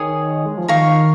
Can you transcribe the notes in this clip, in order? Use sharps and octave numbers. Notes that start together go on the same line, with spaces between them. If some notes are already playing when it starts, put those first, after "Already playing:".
Already playing: D#3 G#4 C#5 G#5 D#6
G#3
F3
D#3 A#4 F5 C#6